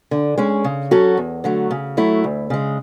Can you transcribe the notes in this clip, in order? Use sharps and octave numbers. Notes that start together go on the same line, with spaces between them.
D3
G#3 C#4
C#3
F#3 C#4 F#4 A4
E2
D3 F#3 A3
C#3
F#3 A3 E4
D2
C#3 G#3